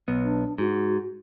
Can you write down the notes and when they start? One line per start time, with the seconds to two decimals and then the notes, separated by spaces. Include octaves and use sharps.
0.08 B1 B3
0.23 D4
0.58 G#2 F#4